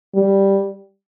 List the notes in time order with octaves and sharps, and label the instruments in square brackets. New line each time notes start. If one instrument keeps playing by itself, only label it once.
[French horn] G3